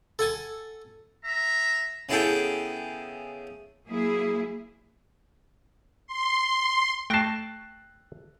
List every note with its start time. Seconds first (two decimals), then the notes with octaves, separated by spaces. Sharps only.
0.19 A4 F#5 G#5 A5
1.24 E5 A#5
2.09 C#3 B3 E4 G#4 A4 G5
3.87 F#3 A#3 E4 G#4
6.07 C6
7.10 A3 G5 A5 C#6 F#6 A#6 C7